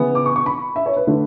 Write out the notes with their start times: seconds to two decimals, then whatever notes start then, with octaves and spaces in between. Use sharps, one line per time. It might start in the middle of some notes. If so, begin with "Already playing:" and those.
Already playing: C#3 E3 B3
0.15 D6
0.26 C#6
0.36 C#6
0.46 B5
0.76 E5
0.86 C#5
0.97 B4
1.07 D3 A3